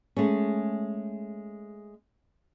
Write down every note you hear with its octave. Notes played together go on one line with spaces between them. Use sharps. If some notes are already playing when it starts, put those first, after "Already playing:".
G#3 A3 C#4